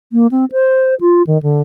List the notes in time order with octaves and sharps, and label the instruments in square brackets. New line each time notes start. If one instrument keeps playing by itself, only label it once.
[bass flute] A#3
C4
C5
F4
D#3
D3